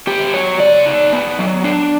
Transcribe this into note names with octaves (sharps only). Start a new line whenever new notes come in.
B3 G4
F#3 C#5
C#3 D5
D#4
B3
F#3
D4